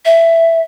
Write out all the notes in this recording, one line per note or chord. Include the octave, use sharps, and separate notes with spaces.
E5